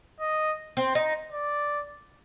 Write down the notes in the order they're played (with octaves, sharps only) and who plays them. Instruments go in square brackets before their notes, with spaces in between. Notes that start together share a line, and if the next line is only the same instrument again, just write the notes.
[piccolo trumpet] D#5
[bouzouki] C4
D#4
[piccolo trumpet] D5